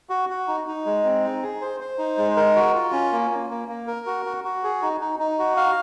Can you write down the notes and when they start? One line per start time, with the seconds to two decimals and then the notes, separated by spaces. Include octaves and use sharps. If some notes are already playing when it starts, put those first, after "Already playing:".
0.10 F#4
0.29 F#4
0.48 D#4
0.67 D#4
0.86 G#3
1.04 C4
1.24 D#4
1.43 G#4
1.62 C5
1.80 C5
1.98 D#4
2.18 G#3
2.36 A#4
2.56 F#4
2.75 F4
2.93 C#4
3.12 A#3
3.31 A#3
3.50 A#3
3.68 A#3
3.87 A#4
4.06 F#4
4.25 F#4
4.44 F#4
4.64 G#4
4.82 D#4
5.01 D#4
5.19 D#4
5.39 F#4
5.57 F5